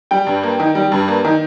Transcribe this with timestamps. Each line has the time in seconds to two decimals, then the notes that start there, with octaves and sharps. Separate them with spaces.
0.11 G3 G5
0.27 G2
0.43 A#3
0.60 D#3
0.75 G3
0.92 G2
1.08 A#3
1.25 D#3